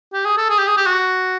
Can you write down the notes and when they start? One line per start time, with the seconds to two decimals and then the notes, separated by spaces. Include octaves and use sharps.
0.13 G4
0.25 G#4
0.38 A4
0.50 G#4
0.59 G4
0.67 G#4
0.77 G4
0.86 F#4